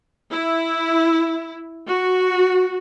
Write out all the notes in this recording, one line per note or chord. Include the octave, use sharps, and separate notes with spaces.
E4
F#4